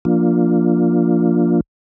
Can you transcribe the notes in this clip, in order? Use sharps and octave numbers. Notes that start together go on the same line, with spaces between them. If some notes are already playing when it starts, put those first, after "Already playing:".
F3 A#3 D4 F4